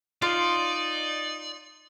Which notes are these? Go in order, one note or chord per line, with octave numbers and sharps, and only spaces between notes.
D#4 F4 D5 C6